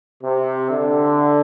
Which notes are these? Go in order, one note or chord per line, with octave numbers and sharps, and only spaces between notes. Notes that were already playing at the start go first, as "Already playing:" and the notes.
C3
D3